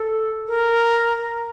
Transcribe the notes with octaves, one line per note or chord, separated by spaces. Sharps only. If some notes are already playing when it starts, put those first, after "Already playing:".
Already playing: A4
A#4